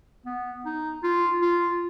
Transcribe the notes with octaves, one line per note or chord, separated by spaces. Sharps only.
B3
D#4
F4
F4